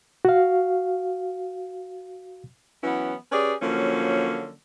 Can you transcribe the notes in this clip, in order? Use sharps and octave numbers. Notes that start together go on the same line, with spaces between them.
F#4 F5
E3 F#3 B3 C#4 E4
C#4 G4 G#4 B4 D5
D3 F3 F#3 A#3 C#4